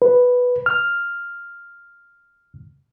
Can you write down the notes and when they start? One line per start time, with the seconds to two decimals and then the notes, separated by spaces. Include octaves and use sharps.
0.02 B4
0.66 F6